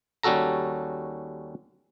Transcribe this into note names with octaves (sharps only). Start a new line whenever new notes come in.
D#2 G3 C#4 F#4 A4 A#5